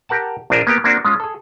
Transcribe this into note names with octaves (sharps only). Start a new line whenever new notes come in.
G4 A#4 F#5 A5
A#1 D4 F4 A#4 C5 G#5
A#3 B3 G4
A#3 C4 D4 F#4
G#3 C#4 F4
G#4 A4